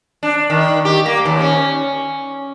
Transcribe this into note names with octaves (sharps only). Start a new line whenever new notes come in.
D4
D#3
G4
A#3
D#2
C#4